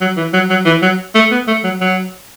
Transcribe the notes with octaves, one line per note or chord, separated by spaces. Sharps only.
F#3
E3
F#3
F#3
E3
F#3
A3
B3
A3
F#3
F#3